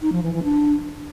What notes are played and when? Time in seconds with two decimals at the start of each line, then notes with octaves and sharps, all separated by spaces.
0.02 D#4
0.12 F3
0.23 E3
0.33 E3
0.43 D4